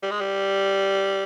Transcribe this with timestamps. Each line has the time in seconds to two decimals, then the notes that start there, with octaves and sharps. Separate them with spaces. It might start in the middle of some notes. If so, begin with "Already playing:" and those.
0.03 G3
0.11 G#3
0.20 G3